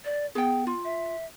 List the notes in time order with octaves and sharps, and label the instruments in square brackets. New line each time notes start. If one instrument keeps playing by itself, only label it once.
[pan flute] D5
[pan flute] B3 [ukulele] G#4 G5
[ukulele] F4
[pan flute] E5